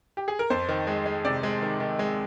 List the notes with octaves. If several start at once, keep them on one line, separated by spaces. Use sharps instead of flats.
G4
G#4
A#4
F2 C5
D#3
G#3
G#3
C3 D5
G#3
D#3
D#3
G#3